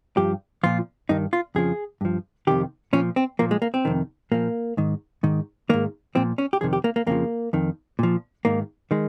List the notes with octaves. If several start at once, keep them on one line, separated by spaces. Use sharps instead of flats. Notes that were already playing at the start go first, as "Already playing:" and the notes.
G2 F3 G4
A#2 F3 F4
G2 D#3 D#4
F4
F2 C#3 F3 G#4
G2 F3
F2 C3 D#3 G4
A#2 F3 C#4
C4
A#2 F3 A#3
G#3
A#3
C4
F2 C3 D#3
A#2 F3 A#3
G#2 D#3
G#2 D#3
G#2 D#3 A#3
A#2 F3 C4
C#4
G4
F2 C3 D#3 G#4
G4
A#3
A#3
F2 C#3 F3 A#3
F2 D#3
A#2 F3
G#2 D#3 A#3
D#3 G#3